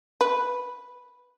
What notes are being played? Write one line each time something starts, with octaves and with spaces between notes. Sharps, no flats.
B4